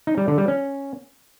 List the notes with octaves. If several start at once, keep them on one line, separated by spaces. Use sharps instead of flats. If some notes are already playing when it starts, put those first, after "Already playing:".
D#4
G3
D3
G3
C#4